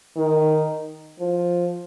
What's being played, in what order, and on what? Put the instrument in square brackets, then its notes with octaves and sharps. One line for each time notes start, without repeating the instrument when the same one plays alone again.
[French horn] D#3
F3